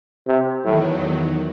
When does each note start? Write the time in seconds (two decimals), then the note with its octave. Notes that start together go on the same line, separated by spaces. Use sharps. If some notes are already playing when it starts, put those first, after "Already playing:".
0.27 C3
0.64 E2 A2 D#3 F#3